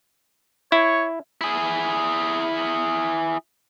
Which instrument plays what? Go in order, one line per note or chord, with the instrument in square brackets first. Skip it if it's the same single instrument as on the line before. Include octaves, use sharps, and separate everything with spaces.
[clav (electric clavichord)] E4 [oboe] C#5
[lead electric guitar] E4 G#4